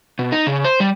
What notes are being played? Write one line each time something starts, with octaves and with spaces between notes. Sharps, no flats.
B2
D#4
C#3
C5
G3